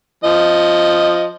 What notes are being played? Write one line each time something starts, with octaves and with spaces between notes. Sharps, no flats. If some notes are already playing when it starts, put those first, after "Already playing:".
F3 D#5